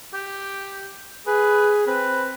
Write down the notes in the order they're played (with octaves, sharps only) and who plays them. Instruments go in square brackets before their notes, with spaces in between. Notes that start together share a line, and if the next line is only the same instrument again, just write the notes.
[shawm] G4
[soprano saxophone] G#4 [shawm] B4
[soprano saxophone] C4 [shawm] B4